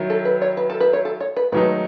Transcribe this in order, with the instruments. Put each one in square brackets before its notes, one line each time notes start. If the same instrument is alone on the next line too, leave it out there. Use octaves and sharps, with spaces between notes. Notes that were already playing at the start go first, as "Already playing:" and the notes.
Already playing: [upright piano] D#3 F#3 E4
[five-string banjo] A4
B4
C#5
B4
A4
B4
C#5
A4
C#5
B4
[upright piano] G#2 D#3 F#3 A3 D#4 [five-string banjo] B4